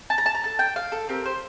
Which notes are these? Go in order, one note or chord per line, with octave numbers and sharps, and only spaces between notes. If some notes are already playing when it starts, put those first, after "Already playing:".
A5
A#5
A5
A#5
D4 A4 A5
G5
F5
A4
C4 G4 A#4
C5